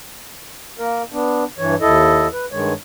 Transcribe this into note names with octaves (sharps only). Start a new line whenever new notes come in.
A#3 A#4
B3 D4
G2 E3 C#5
D#2 E4 A4 D#5
B4
G2 D#3 G#3 C#5